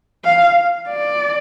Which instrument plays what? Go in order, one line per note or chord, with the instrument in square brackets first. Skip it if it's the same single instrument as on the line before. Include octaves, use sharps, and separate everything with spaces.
[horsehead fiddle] F5
D5